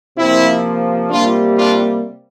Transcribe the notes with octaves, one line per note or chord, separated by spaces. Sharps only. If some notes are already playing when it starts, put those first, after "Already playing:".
C3 F3 A#3 C4 E4
C3 G3 A#3 D4 F4
D4 F4